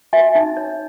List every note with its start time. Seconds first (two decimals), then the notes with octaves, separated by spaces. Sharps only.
0.13 F#4 E5 G#5
0.35 D#4
0.57 C#5